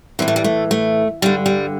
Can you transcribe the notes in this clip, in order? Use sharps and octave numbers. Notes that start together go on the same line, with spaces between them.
A2 E3 C4
A3
G3
A3
A3
G2 D3 G3
G3